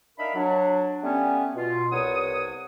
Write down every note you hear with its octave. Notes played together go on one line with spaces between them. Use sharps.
D4 D#4 A#4 E5 F5 B5
F#3 D4
G3 A3 B3 C#4
B2 F4
C2 B3 C#5 D#6